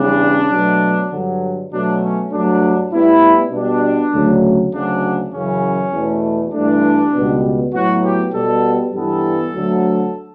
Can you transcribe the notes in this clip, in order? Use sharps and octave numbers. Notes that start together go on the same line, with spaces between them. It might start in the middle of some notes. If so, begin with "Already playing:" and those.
Already playing: E2 C#3 G3 B3 D4
B2 F#3 A3
G2 D3 F#3
B2 F#3 A3 D4
C#4
G2 F#3 A3 D4
A2 G3 B3 E4
B2 G3 B3 D4
D2 C#3 F#3 A3
D2 C#3 F#3 D4
F#2 C#3 E3 C#4
E2 B2 A3
G2 E3 A3 D4
C#2 B2 G3 B3
A2 F#3 B3 F#4
G4
B2 G3 B3 A4
G2 E3 G3 B3 A4
D2 D3 F#3 A3